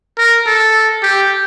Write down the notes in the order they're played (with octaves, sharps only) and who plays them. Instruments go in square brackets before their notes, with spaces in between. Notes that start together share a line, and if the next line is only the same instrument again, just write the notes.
[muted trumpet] A#4
A4
G4